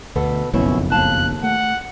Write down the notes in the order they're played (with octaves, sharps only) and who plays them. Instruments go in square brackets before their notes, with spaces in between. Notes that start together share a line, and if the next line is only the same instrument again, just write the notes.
[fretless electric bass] D2 [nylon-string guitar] B2 B3 A4
[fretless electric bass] F#1 B1 F2 [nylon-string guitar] B2 C#4 E4
[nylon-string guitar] D#2 F5 A5 [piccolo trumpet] F#6
[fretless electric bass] A3 [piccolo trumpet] F#5